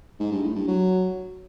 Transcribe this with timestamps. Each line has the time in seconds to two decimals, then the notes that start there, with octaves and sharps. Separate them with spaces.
0.20 G#2
0.32 G2
0.43 A2
0.55 G2
0.67 F#3